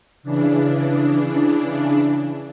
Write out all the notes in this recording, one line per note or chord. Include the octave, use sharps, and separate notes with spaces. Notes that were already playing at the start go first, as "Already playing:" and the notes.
C#3 E3 D4